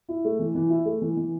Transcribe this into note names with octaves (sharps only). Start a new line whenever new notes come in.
E4
A3
E3
E3
E4
A3
E3
E3